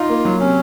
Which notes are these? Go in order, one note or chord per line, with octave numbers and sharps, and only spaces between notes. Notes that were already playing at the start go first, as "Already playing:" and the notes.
Already playing: D#4 F4
A#3
F#3
C3 C#4